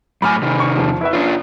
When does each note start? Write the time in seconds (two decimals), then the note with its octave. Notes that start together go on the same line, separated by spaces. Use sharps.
0.22 F#2 A2 G#5 B5 D6 F6
0.42 C3 D#3
0.60 C#6
0.77 E2 F3
1.01 E4 B4 E5
1.13 C#4 D4 F4